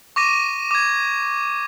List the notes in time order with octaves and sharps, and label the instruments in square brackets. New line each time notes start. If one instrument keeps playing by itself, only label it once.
[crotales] C#6 D6 A#6 D#7
D6 G#6